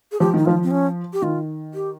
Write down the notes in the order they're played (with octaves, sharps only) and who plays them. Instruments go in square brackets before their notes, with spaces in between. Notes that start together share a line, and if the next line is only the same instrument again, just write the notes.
[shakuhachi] G#4
[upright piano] F3 [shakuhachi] G4
[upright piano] D#3 [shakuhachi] D#4
[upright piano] F3 [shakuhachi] F4
[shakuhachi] C4
C#4
G4
[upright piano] D#3 [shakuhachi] F4
[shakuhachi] G4